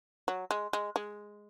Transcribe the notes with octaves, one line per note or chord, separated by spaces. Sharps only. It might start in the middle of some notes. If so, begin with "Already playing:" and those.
F#3
G#3
G#3
G#3